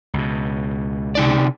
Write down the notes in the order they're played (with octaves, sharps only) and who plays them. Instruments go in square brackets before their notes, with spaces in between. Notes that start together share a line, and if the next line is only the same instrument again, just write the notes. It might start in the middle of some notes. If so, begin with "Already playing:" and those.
[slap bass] C#2 B2
[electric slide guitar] C3 D#4 D5